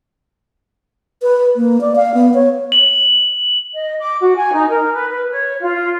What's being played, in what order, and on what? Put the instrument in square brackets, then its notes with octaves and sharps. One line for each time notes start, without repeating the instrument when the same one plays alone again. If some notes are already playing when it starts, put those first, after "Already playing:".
[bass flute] B4
A#3
D5
F5
B3
C#5
[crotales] F#7
[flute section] D#5
D6
F#4
G#5
D#4
A#4
B4
B4
C#5
F4